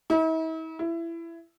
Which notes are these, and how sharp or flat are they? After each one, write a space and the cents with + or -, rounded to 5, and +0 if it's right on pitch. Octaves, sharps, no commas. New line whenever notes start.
E4 -45
E4 +20